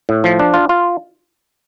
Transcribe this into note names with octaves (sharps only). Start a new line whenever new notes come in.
A2
F3
D4
F4
F4